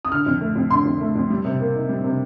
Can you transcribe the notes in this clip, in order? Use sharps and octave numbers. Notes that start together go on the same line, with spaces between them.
D#6
D3 F6
F2
A3
F2
D3 C6
F2
A3
F2
G3
C3
A#3
D#4
G3
C3